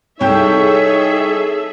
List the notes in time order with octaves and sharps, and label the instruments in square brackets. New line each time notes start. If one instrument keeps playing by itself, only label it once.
[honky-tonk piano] C2 G5 G6 [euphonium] D#4 [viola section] G#4 A4 E5 [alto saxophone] C#5